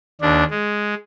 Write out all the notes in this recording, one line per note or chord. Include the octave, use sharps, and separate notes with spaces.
D#2 D4
G#3